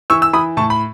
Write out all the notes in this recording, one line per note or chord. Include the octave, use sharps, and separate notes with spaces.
E3 C#6 E6
E6
E3 B5 D#6
A2 A5 C#6
B5